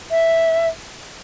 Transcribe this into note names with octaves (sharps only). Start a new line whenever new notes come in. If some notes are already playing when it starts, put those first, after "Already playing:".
E5